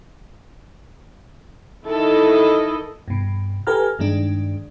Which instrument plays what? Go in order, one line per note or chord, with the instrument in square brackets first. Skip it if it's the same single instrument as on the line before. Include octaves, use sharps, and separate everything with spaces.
[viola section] D#3 E4 A4 D#5
[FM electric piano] G2 B2
G4 A4 B4 G#5 A#5 F6
G2 D#3 G#3 D4